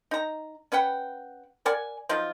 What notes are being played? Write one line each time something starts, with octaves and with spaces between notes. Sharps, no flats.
D#4 A#5
C#4 B4 F#5 G5
A#4 D5 F#5 G#5
F3 F#3 D#4 F4